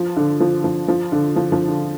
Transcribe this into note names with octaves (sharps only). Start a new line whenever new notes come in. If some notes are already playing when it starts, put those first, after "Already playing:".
Already playing: F3
D3
F3
F3
F3
D3
F3
F3
D3